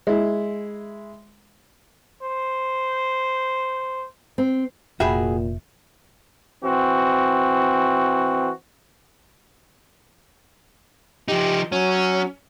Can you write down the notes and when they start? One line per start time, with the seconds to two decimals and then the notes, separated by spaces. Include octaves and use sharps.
0.07 G#3 E4
2.22 C5
4.38 C4
5.00 F1 A#2 F#4 G#4 E5 G5 B5
6.63 E3 C4 F#4
11.28 F3 D#4 G4
11.72 F#3 C#4